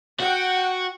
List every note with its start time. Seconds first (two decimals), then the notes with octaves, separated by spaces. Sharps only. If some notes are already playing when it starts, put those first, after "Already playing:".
0.20 F#4 F#5 G5